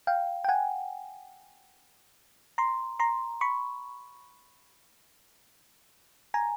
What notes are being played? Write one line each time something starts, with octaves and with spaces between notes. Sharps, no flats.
F5 G5
G5
F#5 G#5
A#5 C6
A#5 C6
B5 C#6
G#5 A#5